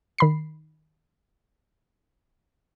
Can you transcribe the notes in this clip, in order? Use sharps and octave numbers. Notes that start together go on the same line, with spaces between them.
D#3 B5 C7